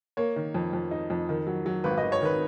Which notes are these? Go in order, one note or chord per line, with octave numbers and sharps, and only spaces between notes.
A#3 C#5
D#3
F2
F2
D#4
F2
D#3
F#3
F#3
G#1 B4
D#5
G#1
C#5
D#3 B4